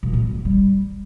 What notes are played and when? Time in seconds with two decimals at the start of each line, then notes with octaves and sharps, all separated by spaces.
0.03 A#2
0.13 A3
0.24 F#3
0.34 A2
0.45 G3